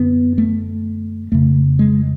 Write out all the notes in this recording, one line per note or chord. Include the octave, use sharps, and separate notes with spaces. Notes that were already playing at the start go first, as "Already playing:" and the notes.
Already playing: F#2 D3 B3
A3
F2 C#3 A3
G#3